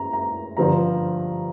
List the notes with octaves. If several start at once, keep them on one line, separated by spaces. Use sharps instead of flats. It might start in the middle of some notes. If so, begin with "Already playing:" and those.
Already playing: A#5
A#5
G2 D3 F3 A#5